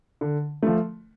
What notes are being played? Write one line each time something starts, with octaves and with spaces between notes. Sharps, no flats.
D3
F3 A3